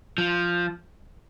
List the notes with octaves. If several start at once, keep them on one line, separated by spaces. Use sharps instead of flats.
F3